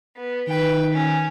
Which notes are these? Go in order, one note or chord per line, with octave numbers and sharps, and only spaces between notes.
B3
D#3 B4 G5
C#4